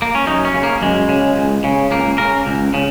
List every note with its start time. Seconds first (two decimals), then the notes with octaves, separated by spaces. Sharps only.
0.02 A#3
0.15 C#4
0.27 F#2 D#4
0.45 C#4
0.54 C#3
0.63 A#3
0.82 F#2 G#3
1.09 C#3
1.36 C#2
1.64 C#3
1.91 C#2 A#3
2.18 C#3 A#4
2.47 C#2
2.74 C#3